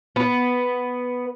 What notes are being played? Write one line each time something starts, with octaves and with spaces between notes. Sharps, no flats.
B3